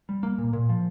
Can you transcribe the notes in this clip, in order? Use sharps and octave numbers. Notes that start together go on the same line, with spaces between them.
G3
A#3
A#2
A#2
F3